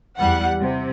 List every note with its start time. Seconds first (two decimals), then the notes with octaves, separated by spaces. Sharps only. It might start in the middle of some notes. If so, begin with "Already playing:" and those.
0.19 E2 G3 F#5
0.61 C3